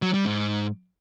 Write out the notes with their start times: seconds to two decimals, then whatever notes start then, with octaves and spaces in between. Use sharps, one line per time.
0.02 F#3
0.14 G3
0.26 G#2